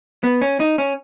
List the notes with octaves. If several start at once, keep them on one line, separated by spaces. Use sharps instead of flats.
B3
C#4
D#4
C#4